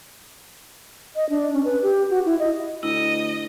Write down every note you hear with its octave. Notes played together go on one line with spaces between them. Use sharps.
D#5
D4
C#4
B4
G4
F#4
E4
D#5
D2 E4 D#5